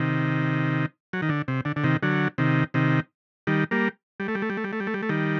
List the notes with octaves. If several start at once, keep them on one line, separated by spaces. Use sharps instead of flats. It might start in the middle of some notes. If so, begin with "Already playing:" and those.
Already playing: C3 D#3
F#3
D#3
D3
C3
D3
D3
C3 D#3
D3 F#3
C3 D#3
C3 D#3
D#3 G3
G3 A#3
G3
A3
G3
A3
G3
A3
G3
A3
G3
A3
G3
A3
D#3 G3